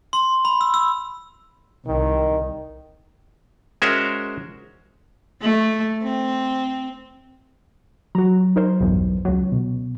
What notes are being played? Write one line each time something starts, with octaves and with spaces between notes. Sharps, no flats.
C6
B5
E6
E6
C2 D#3
G#3 C#4 F#4 A#4 C5 E5
A3
C4
F#3 F#4 A#5
D#4 A#4 C5
B1 E2 G2
C#2 F#3
B2